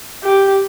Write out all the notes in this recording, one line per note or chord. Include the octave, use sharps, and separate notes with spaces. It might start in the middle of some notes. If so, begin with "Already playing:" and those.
G4